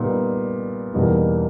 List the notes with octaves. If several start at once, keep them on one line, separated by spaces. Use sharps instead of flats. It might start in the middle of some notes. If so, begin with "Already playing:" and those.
Already playing: A#2 G3 B3 D#4
E2 B2 G3 A#3 D#4